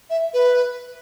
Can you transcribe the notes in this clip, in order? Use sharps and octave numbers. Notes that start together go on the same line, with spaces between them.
E5
B4